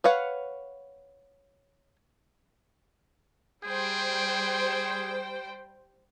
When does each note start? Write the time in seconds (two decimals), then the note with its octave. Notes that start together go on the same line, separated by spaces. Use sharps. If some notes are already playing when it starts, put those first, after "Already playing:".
0.04 B4 C#5 F5 F#5
3.64 G3 G#4 C5 G5